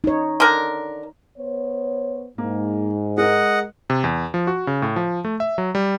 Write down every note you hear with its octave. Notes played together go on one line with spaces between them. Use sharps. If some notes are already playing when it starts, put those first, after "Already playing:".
D#4 C#5
D3 A#4
B3 C5 C#5
G#2 A#3
G#3 A#4 D#5 F#5
C3
E2
F3
F#4
C#3
A2
F3
A3
E5
F#3
G3